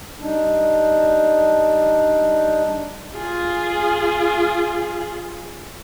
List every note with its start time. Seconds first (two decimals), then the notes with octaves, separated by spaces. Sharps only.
0.20 G3 D4 D#4
3.15 F4 G#4